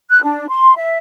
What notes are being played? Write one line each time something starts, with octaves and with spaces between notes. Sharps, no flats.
F#6
D4
C6
E5